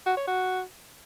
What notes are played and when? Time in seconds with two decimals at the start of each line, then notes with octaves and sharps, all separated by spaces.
0.06 F#4
0.17 C#5
0.27 F#4